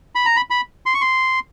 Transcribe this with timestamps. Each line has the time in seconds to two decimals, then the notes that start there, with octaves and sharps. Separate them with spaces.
0.15 B5
0.26 A#5
0.36 B5
0.50 B5
0.86 C6
0.94 C#6
1.01 C6